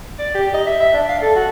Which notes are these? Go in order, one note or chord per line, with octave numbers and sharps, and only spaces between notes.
D5
G4
D#5
E5
E5
D4
F5
A4
F#4